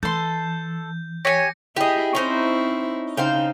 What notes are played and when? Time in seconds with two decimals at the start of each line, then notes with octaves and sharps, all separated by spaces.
0.03 E3 A4 C6 G6
1.25 G4 C#5 G#5 A#6 C#7
1.76 E4 G4 G#4 D#5
2.15 C4 C#4 D#4 E4 C5
3.17 C#3 D#4 C5 F5 G5